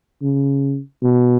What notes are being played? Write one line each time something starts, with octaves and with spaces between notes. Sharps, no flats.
C#3
B2